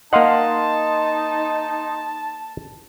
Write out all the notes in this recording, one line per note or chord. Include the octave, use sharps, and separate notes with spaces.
A#3 D#4 D#5 F5 F#5 A5 C6 D#6